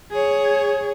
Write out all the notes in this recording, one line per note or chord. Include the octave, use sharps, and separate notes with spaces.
G#4 C#5